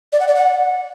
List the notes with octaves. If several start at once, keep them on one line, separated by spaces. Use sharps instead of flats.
D5
F#5
D5
F#5